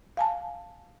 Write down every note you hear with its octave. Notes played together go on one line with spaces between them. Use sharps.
F5 G#5 A5